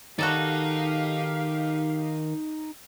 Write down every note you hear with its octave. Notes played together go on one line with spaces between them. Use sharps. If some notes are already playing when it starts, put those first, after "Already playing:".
D#3 D#4 F#4 G4 A4 D5 F5 A#5